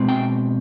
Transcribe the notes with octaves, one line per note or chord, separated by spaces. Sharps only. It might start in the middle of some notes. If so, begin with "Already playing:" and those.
Already playing: B2 G#3 C4
G5